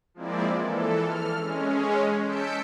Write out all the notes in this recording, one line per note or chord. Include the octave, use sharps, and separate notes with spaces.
F3 G#3 A#3 C4 E4 D5
E3 A4
F6
G#3 C#4
A5 E6 G6 B6 C#7 D7